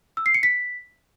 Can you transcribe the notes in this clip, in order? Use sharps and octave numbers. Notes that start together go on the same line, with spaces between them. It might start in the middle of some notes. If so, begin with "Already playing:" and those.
E6
C7
C#7
B6